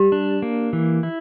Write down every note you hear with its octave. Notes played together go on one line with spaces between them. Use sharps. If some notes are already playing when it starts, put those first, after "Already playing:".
Already playing: G3 G4
D4
A#3
E3
E4